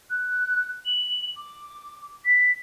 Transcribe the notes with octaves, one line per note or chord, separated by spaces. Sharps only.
F#6
F#7
D6
B6